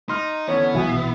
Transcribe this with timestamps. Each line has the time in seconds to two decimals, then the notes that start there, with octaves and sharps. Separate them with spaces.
0.09 D#4 C6 F6
0.48 D3 E3 B3 C#4 C#5
0.74 C2 E3 F#3 F#4 E5 F5 G#5
0.89 A#1 B2 E3 C7